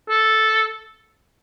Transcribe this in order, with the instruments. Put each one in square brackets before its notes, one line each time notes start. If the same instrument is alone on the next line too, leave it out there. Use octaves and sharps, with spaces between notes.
[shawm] A4